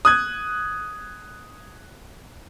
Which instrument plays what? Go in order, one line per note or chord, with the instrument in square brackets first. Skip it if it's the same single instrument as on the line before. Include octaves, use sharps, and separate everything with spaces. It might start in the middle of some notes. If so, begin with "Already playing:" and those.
[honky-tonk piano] D#6 F#6 G#6